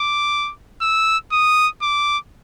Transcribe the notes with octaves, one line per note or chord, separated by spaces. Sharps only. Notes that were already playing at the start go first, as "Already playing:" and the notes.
Already playing: D6
E6
D#6
D6